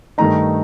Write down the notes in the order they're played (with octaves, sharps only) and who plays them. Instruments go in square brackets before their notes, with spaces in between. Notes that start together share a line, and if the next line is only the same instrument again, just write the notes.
[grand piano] G2 D#3 A3 D#4 A#5